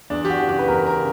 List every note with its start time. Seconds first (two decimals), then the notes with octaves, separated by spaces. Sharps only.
0.10 E2 D4
0.25 G4
0.30 F#4
0.39 C#3 E3
0.49 G4
0.59 B4
0.68 E2 A#4
0.87 A#4
0.97 C#3